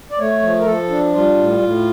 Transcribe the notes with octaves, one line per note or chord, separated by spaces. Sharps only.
D5
A3 C#5
F3
A#4
F3 A4
D4
G3 F4
A2
A2